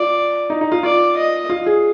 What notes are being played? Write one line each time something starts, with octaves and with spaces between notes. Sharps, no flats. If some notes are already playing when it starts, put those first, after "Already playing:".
Already playing: F4 D5
D#4
D#4
F4
F4 D5
D#5
F4
G#4